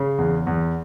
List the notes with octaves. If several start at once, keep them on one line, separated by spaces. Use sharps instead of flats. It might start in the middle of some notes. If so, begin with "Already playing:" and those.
Already playing: C#3
E2
E2